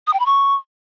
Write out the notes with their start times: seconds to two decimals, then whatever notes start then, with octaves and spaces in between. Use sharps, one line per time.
0.07 D#6
0.13 G5
0.20 B5
0.26 C#6